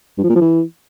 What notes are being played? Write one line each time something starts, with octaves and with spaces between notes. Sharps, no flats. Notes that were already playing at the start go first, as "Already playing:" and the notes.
G2
F3
A#2
F3
E3